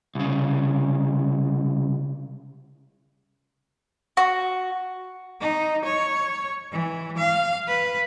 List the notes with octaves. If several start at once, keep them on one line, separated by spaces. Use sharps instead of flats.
C2 C#3
F#4
D#4
C#5
E3
F5
B4